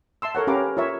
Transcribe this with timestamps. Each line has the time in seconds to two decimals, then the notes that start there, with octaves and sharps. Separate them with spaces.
0.22 E5 A5 C6 E6
0.35 A4 A#4 C#5 F#5
0.47 C#4 G4 A#4 B4 F5 D6
0.77 F4 A#4 C#5 E5